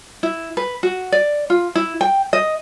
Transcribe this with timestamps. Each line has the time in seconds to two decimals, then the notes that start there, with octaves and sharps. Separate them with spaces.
0.23 E4
0.57 B4
0.83 F#4
1.12 D5
1.50 F4
1.75 E4
2.01 G5
2.33 D#5